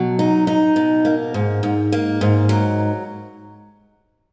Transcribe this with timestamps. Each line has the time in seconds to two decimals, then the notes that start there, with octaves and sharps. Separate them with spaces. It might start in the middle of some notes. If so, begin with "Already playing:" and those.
Already playing: B2 F#3
0.19 D#4
0.47 D#4
0.76 B2
1.05 A#3
1.34 G#2
1.63 G#2
1.92 A#3
2.21 G#2
2.49 F#3